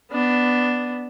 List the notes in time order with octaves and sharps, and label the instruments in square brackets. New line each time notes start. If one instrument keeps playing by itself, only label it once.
[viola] B3 D4